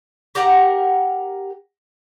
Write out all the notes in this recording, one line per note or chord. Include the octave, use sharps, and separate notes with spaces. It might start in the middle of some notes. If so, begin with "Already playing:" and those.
G4 A#4 F#5 G5